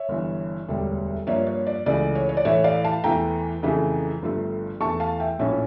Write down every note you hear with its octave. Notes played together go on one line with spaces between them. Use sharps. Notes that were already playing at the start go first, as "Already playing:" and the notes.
Already playing: C#5 E5
G1 G2 E3
E1 D2 D3 G3
G2 F3 A#3 D4 C#5 E5
C#5
D5
C#2 C#3 E3 A3 D5
C#5
C#5
D5
A2 E3 A3 C#5 E5
D5 F5
F5 A5
E2 E3 A3 G5 A#5
F2 C#3 E3 A3
G1 G2 F3 A3
E2 E3 A3 A5 C#6
F5 A5
E5 G5
A#1 A2 F3 C#4 E4 C#5 E5